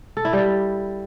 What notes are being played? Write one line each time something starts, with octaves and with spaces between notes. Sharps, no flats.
A4
E4
G3